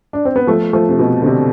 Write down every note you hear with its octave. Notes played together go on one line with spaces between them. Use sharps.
D4
C4
B3
F3 A3
F3 A3
C3
B2
D3
C3